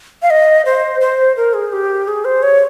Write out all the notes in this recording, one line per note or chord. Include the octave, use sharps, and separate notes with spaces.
F5
D#5
C5
C5
A#4
G#4
G4
G#4
C5
C#5